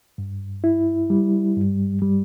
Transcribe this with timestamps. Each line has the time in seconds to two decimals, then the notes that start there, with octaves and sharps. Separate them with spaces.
0.18 G2
0.64 E4
1.10 G3
1.57 G2
2.02 G3